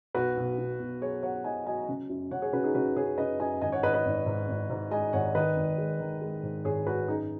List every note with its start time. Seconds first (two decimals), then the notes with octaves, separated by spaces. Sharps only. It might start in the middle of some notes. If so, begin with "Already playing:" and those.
0.15 B1 F#4 B4
0.37 B1
0.58 B2
0.80 B1
1.02 F#3 G#4 C#5
1.23 F#3 C#5 F#5
1.44 F#3 D#5 G#5
1.66 F#3 D#5 G#5
1.89 C#3
2.09 F#2
2.31 C#3 C#5 F#5
2.42 G#4 C#5
2.53 C#3 F#4 B4
2.64 D#4 G#4
2.74 C#3 F#4 B4
2.96 C#3 G#4 C#5
3.18 C#3 B4 D#5
3.40 F#2 D#5 G#5
3.61 G#1 D#5 G#5
3.72 C#5 F#5
3.83 G#1 B4 D#5
3.94 B4 D#5
4.05 G#1
4.26 G#2
4.48 G#1
4.70 G#2
4.91 G#3 D#5 G#5
5.13 G#1 C#5 F#5
5.35 D#3 B4 D#5
5.56 G#1
5.78 G#3
6.00 D#3
6.21 G#3
6.43 G#2
6.65 G#1 G#4 C#5
6.86 G#1 F#4 B4
7.08 F#2 D#4 G#4